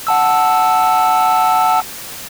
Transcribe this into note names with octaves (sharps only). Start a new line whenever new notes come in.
F#5 A5 E6